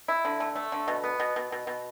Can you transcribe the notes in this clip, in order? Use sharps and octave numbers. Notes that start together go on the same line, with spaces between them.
E4
D3
A3
A3
D3
B2
B3
B2
B2
B2
B2